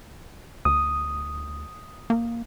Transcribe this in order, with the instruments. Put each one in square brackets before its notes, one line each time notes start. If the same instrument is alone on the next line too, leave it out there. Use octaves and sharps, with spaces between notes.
[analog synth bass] D2 [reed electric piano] D#6
[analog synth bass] A#3